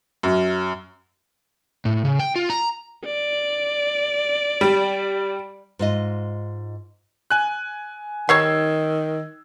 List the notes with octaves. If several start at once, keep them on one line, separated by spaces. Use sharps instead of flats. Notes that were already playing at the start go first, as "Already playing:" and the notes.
F#2
A2
C#3
G5
F4
A#5
D5
G3
G#2 F4 D#5
G#5 F#6
D#3 G3 D#4 C#5 E6 G#6 C7